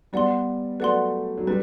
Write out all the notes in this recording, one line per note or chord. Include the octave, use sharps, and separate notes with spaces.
G3 B3 B4 D5 F#5 C6
F#3 A3 B4 D5 F#5 C6
F#3
G3 B4